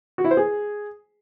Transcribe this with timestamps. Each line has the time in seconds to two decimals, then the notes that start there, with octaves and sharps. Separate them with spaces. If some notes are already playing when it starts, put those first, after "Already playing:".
0.18 F#4
0.24 E4
0.31 C5
0.37 G#4